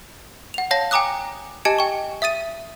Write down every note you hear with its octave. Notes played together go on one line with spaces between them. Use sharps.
F#5 F7
C#5 F5 A5 A#6
G5 G#5 A#5 D6 D#6 F#6
G4 D#5 G#5 A5 G#6 C#7
G5 C#6
E5 D#6 A6 D#7